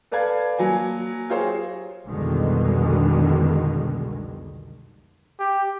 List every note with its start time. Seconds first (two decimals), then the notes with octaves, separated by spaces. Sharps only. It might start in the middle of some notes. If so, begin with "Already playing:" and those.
0.12 A4 B4 D5 F5 A5 G#6
0.58 F#3 A#3 G#5
1.30 F4 G4 G#4 C5 C#5
2.07 C2 F2 B2 D3 D#3 G#3
5.39 G4